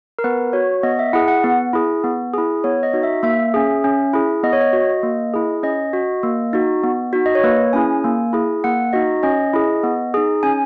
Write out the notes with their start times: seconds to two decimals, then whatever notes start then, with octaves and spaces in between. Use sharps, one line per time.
0.19 A#4
0.24 B3 B4
0.53 F#4 C#5
0.83 B3 D#5
0.99 E5
1.13 E4 G#4 F#5
1.28 F#5
1.44 B3
1.73 E4 G#4
2.04 B3
2.34 E4 G#4
2.64 B3 C#5
2.83 D#5
2.93 D#4 F#4
3.03 E5
3.23 A#3 E5
3.54 C#4 G#4
3.84 C#4
4.13 E4 G#4
4.43 B3 D#5
4.53 C#5
4.61 D#5
4.73 F#4
5.03 A#3
5.34 E4 G#4
5.63 C#4 D#5
5.93 F#4
6.23 A#3
6.53 D#4 F#4
6.83 B3
7.13 D#4 F#4
7.26 D#5
7.35 C#5
7.43 A#3 B4
7.73 C#4 E4 G#4 G#5
8.04 A#3
8.33 E4 G#4
8.64 A#3 F#5
8.93 D#4 F#4 D#5
9.23 C#4 D#5
9.54 E4 G#4
9.83 B3
10.14 D#4 G#4
10.43 C#4 G#5